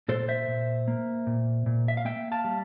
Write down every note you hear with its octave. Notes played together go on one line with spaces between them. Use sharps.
A#2 A4 C5
C5 E5
A#2
A#3
A#2
A#2
E5
F5
A#3 E5 G5
F5 A5
G3